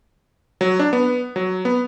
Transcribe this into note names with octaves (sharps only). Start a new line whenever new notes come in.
F#3
D4
B3
F#3
B3